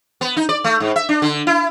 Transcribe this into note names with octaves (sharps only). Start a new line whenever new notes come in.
B3
D#4
D5
A3
G#2
E5
D4
D3
E4